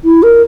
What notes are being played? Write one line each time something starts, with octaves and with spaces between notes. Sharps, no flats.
E4
A#4